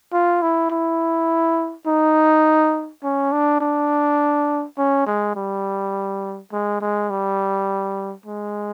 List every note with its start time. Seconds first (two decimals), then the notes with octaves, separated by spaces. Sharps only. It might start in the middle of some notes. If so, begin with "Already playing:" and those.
0.13 F4
0.42 E4
0.71 E4
1.87 D#4
3.04 C#4
3.32 D4
3.61 D4
4.78 C#4
5.07 G#3
5.36 G3
6.52 G#3
6.81 G#3
7.10 G3
8.26 G#3